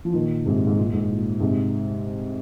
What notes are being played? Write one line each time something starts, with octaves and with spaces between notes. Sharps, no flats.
F3
A#2 D#3
G#2 C3
G#2
A#2
G#2
A#2
G#2 C3